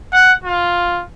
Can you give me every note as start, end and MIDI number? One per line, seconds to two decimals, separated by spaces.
0.13 0.32 78
0.44 1.03 65